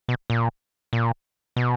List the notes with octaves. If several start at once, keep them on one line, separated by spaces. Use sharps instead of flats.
B2
A#2
A#2
B2